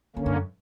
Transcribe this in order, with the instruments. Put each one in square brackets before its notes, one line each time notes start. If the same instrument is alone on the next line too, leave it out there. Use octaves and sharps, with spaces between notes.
[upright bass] F#2 [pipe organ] D3 A#3 C#4
[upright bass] G2
F#2